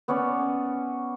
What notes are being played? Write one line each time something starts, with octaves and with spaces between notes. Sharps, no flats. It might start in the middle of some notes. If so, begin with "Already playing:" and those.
B3 C#4 C#5 D5